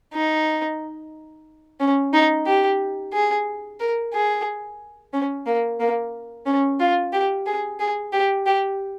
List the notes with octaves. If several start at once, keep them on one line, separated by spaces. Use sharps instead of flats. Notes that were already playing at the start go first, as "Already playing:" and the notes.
D#4
C#4
D#4
G4
G#4
A#4
G#4
C#4
A#3
A#3
C#4
F4
G4
G#4
G#4
G4
G4